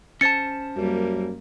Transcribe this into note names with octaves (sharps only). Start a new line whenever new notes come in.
C#4 C5 A5 A6 C#7
F#2 G3 A#3